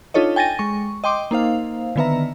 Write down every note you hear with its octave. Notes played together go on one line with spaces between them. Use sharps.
D4 D#4 F4 A4 C#5 D#5
G5 G#5 A6 A#6 D#7
G#3 C#6
D#5 G5 C6 D6
A#3 D#4 C5 F5
D3 D#3 B3 B4 E5 A#5